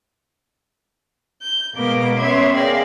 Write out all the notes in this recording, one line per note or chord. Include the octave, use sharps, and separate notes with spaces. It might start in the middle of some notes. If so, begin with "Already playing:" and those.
G6
B2 G#3 A#3 B3 A#4 D6
B3 C#4 C#5 E5 C6 G#6
G#4 A#4 D5 F5 G5